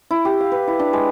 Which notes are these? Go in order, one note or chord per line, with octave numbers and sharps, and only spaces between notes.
E4
G4
F5
B4
E4
D4
G#3